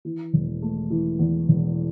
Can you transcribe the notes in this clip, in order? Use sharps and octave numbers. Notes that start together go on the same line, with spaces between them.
E3
E1
A3
E3
E2
E1